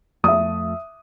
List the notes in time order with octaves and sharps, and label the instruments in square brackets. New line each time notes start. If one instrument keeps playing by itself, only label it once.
[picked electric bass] F2 F3 A3 [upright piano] E5 D#6